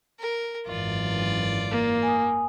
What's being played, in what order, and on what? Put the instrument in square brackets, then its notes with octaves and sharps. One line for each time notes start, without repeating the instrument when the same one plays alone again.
[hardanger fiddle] A#4
[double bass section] G#1 F#2 E3 [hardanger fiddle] F4 D5
[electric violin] A#3
[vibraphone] G#5 D#6